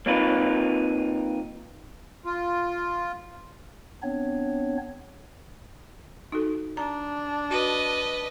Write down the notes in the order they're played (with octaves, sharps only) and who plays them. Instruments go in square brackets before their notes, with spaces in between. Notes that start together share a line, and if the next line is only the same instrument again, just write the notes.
[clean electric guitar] A#3 C4 D#4 F4 B4
[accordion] F4
[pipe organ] B3 C4 D4 C#5
[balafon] D#4 F#4 A4
[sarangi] D4 [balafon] A#5
[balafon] F#4 [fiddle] B4 D#5